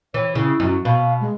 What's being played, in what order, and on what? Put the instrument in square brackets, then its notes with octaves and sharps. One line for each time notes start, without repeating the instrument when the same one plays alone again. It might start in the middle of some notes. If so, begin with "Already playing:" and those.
[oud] E3 [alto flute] C#5
[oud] C#3 [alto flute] E4
[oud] F#2
[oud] B2 [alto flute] F5
[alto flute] G#3